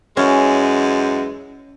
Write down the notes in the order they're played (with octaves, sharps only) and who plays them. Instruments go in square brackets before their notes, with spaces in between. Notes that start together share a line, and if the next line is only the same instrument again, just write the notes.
[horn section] F#2 E3 G#3 [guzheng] C#4